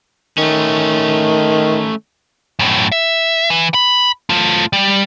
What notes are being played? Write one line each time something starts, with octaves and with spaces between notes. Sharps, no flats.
D#3 A3 C#4
F#2 A2
E5
E3
B5
A3 F4
G3